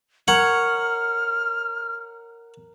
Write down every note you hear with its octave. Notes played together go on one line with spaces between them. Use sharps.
A#4 C#5 F#5 F6